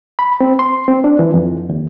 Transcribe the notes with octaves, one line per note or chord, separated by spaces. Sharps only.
B5
C4
C6
C4
D4
E3
F2
D#2